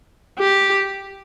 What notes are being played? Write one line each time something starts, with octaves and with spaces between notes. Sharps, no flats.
G4